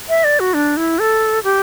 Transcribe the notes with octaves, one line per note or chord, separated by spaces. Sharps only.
E5
D5
F#4
D4
E4
A4
G4